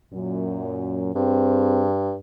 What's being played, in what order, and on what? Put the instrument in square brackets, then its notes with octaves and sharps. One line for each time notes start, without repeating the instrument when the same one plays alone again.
[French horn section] F#2 A#2
[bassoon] G2 [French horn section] C4 G#4